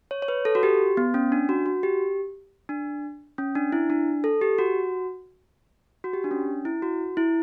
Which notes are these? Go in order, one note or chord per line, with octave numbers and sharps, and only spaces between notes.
C#5
C#5
B4
A4
F#4
G4
B3
C#4
D4
F#4
F#4
G4
D4
C#4
D4
E4
D4
A4
G4
F#4
F#4
G4
D4
C#4
E4
F#4
E4